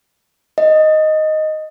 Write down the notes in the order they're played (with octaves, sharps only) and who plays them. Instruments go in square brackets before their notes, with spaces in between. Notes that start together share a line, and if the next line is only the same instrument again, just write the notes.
[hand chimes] D#5